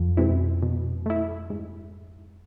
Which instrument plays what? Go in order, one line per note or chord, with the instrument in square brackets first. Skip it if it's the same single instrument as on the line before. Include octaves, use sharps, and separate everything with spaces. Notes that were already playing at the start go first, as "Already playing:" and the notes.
Already playing: [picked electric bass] F2
[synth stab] B2 G#3 C4 E4
B2
A3 E4
G#2